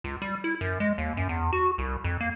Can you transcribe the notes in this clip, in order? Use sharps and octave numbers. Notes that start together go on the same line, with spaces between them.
C#2
G3
E4
F#2
G#3
D#2
F#2
E2
F#4
C2
F2
A#3